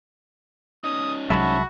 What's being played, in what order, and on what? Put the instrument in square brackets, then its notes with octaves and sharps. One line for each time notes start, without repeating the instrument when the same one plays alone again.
[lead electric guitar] C#4 D#4 [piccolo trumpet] D#6
[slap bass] C2 F#3 G#3 [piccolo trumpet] F#4 [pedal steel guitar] E5 A5 B5